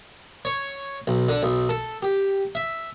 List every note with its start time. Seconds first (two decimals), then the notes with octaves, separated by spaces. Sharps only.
0.45 C#5
1.07 B1
1.29 D3
1.43 B1
1.69 A4
2.03 G4
2.55 E5